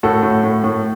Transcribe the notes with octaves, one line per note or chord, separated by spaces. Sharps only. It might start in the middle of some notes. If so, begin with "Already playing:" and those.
A2 F#4 A4
A2
A2
A2